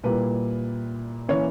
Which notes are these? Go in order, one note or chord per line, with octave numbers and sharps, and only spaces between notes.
A#2 G3 A#3 E4 B4
E3 A#3 C#4 C#5